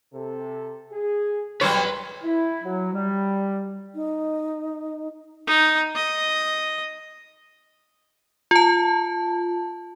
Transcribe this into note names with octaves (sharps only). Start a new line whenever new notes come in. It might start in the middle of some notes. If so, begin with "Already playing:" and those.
C3 A4
G#4
B1 G#2 F#3 G3 B4 C#5 C6
E4
F#3
G3
D#4
D#4
D#5
F4 A5